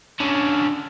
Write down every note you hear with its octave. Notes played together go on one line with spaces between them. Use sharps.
D3 C#4